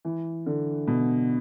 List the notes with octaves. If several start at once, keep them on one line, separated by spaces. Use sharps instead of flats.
E3
D3
B2